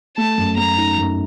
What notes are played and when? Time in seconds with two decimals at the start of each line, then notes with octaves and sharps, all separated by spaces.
0.17 A3 A5
0.37 F#2
0.57 A3 A#5
0.77 D#4
0.97 F#2